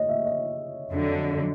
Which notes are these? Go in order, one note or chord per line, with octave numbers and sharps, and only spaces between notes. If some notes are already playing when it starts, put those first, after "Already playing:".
Already playing: C#5 D#5
E5
D#5
F2 D3 F#3